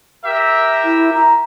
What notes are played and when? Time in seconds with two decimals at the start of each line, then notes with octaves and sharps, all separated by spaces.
0.24 G4 A#4 E5
0.84 E4
1.13 A#5